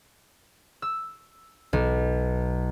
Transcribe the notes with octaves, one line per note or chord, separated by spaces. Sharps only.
E6
B1